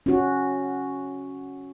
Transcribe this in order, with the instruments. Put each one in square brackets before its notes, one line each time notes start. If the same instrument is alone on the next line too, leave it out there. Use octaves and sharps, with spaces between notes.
[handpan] C#4 F#4